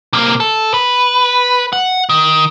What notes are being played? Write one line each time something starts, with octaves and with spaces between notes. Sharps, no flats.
C3 A#3
A4
B4
F#5
D#3